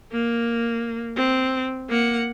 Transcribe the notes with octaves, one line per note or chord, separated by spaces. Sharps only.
A#3
C4
A#3 F#5